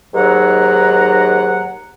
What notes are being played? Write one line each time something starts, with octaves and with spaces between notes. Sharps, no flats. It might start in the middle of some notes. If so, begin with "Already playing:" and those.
D#2 G#2 F#3 F#5 A#5